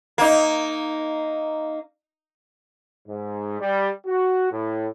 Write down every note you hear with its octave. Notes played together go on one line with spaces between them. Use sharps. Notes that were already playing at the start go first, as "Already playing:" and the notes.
A#3 D#4
G#2
G3
F#4
A2